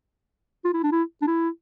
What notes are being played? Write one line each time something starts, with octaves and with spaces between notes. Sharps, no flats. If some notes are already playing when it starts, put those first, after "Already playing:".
F4
E4
D4
E4
D4
E4